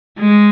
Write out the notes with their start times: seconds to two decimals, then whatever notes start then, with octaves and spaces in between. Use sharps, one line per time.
0.19 G#3